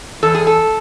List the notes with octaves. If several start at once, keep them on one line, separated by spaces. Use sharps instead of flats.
E2 A4
G#4
A4